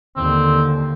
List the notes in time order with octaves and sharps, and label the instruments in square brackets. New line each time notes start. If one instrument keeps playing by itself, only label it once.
[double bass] D#2 D3 [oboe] C4